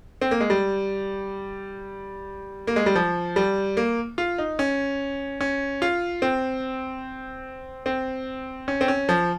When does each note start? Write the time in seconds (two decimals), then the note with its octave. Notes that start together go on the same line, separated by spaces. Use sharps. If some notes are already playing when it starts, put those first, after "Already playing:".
0.21 C4
0.31 A#3
0.40 G#3
0.50 G3
2.67 A#3
2.76 G#3
2.86 G3
2.95 F3
3.36 G3
3.77 A#3
4.18 F4
4.38 D#4
4.59 C#4
5.41 C#4
5.82 F4
6.22 C4
7.86 C4
8.68 C#4
8.81 C4
8.88 C#4
9.09 F3